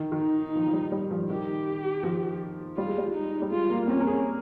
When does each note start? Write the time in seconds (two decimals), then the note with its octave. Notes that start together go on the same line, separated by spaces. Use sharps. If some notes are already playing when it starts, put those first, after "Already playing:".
Already playing: D#3
0.12 D#3
0.18 D#4
0.55 F3
0.67 F3
0.73 G3
0.92 G3
1.11 F3
1.30 D#3 G4
2.03 F3
2.77 G3 F4
2.87 G#3
2.98 G3
3.14 D#4
3.42 G3
3.51 G#3 F4
3.70 A#3
3.82 A#3
3.88 C4 C#4
4.00 A#4
4.07 G#4